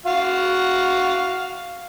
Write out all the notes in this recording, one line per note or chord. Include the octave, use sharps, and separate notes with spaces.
F#4 F5